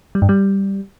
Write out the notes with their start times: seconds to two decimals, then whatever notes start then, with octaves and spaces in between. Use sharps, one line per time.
0.15 G3
0.22 G2
0.29 G3